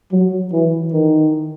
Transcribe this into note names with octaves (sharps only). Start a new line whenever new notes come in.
F#3
E3
D#3